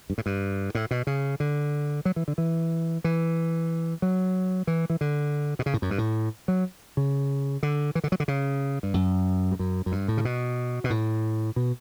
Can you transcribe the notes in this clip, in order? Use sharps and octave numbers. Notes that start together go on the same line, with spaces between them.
G2
A2
G2
A2
B2
C#3
D3
F#3
E3
D3
E3
E3
F#3
E3
E3
D3
B2
C#3
A2
F#2
G2
A2
F#3
C#3
D3
E3
D3
F#3
D3
C#3
G2
F#2
G2
F#2
F#2
G2
A2
C#3
B2
B2
A2
B2